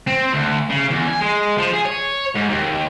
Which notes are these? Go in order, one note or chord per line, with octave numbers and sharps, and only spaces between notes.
C4
D2
C#3
E2
G#5
G#3
F3
G#4
C#5
G#2
D#2